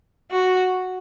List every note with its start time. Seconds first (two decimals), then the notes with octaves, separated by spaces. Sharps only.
0.31 F#4